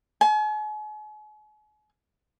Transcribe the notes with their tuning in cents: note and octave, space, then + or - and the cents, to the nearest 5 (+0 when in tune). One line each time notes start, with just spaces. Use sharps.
G#5 +40